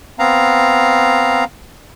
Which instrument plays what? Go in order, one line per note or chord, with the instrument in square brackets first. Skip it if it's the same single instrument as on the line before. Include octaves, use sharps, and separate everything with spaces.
[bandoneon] B3 C4 F5 A#5